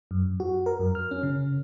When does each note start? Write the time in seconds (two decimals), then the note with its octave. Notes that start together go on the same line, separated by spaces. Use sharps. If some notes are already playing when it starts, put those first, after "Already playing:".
0.11 F#2
0.40 F#4
0.66 A#4
0.80 F#2
0.95 F6
1.11 C#4
1.23 C#3